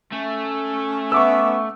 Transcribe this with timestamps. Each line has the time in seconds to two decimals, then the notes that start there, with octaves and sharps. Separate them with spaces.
0.13 A3 C#4
1.12 B3 E5 C#6 D6 E6